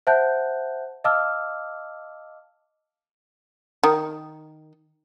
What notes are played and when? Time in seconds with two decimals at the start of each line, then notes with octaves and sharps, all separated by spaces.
0.07 C5 E5 F#5 A5 F#6 G6
1.04 D#5 F5 A5 D6 E6 F6
3.83 D#3